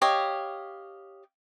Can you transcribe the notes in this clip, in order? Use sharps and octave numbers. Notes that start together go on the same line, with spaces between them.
G4 C#5 D#5 F5